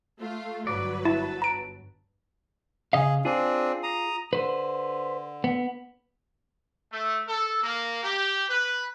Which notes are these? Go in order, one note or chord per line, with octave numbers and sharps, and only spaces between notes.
A3 F4
G1 F#3 B4 D5
E4 A5
A#5 D7
C#3 G#4 D#5 F5
C4 D4 F4 G#4
A#5 D#6
D3 B4 C5
B3
A3
A4
A#3
G4
B4